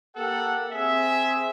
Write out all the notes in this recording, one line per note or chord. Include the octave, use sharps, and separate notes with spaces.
A#3 G4 A4 A#4 F#5
C4 G#4 E5